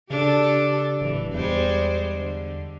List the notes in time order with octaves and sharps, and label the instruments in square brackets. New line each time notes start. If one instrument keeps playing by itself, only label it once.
[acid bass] C#3 [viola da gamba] D4 G4 A4
[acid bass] D1 [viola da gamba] E3
[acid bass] E2 [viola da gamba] G3 G#3 C5
[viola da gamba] D3